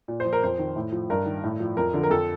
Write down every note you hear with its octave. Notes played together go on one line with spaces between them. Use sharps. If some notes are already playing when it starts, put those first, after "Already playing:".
A#2
C5
F3
A#4
F2 C5
D#3
A2
F3
G2 A#4
D#3
A2
F3
F2 A#4
D3 F3
A#4
F2 A4